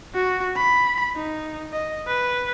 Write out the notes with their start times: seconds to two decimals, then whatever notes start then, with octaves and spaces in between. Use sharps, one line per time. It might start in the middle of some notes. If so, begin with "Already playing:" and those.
0.14 F#4
0.56 B5
1.16 D#4
1.73 D#5
2.07 B4